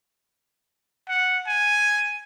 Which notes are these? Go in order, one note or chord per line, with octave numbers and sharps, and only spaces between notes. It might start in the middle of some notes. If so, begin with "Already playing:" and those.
F#5
G#5